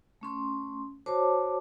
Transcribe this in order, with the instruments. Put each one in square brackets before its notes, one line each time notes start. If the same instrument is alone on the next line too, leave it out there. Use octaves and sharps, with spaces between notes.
[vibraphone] A3 C#4 C6
F#4 A#4 C5 C#5 A5 D6